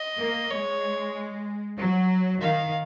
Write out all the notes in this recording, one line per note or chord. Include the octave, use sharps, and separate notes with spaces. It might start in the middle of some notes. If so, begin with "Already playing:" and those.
Already playing: D#5
A#3
G#3 C#5
F#3
D#3 F5